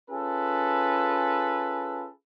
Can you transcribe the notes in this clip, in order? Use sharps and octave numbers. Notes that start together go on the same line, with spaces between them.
C#4 F4 G#4 A4 B4